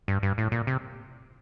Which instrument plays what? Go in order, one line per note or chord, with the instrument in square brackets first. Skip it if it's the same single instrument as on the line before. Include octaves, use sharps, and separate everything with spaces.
[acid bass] G2
G2
A2
A#2
C3